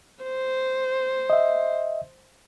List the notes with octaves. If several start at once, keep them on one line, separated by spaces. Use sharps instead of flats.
C5
D#5 E5